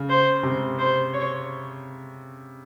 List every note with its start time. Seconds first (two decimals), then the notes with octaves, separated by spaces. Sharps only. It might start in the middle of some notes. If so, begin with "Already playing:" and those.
Already playing: C#3
0.09 C5
0.43 C3
0.79 C5
1.13 C#5